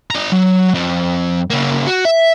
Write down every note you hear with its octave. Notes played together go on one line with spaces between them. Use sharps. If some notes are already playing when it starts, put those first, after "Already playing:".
D4 A#5
F#3
F2
C#3 A#3
F#4
E5